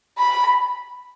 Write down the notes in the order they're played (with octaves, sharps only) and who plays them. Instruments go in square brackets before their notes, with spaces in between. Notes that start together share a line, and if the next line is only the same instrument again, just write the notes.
[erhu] B5